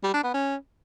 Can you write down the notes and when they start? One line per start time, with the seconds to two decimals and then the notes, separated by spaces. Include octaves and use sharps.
0.03 G3
0.13 D4
0.24 B3
0.34 C#4